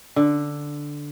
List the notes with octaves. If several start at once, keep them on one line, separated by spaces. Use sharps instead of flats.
D3